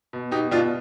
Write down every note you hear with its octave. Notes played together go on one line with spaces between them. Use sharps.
B2
B2 D#4 G4
B2 D4 F4